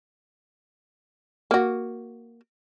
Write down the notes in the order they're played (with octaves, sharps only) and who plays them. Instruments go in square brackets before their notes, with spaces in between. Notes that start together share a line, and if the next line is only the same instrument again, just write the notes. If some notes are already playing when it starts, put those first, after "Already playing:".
[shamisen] A#3 F#4